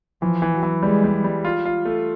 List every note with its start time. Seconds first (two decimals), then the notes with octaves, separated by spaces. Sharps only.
0.21 E3 F3
0.42 E3
0.53 F#3
0.63 E3
0.83 G3 G#3
1.04 G3
1.24 G3
1.45 F4
1.65 F4
1.85 A3